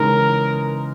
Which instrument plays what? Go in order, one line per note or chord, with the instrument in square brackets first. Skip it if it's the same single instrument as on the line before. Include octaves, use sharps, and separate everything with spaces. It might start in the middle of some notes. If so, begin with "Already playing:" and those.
Already playing: [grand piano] C#3 E3 G#3 D#4 [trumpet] A#4